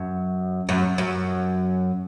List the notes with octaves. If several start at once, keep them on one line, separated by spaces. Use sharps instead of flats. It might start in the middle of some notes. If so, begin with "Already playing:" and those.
Already playing: F#2
F#2
F#2